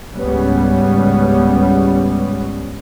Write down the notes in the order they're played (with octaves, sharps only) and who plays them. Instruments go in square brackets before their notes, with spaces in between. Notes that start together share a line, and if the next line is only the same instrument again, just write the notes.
[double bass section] G#1 C#2 C#3 G3 B3 C#4